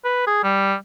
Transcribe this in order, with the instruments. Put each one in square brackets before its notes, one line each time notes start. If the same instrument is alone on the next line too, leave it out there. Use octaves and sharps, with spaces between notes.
[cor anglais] B4
G#4
G3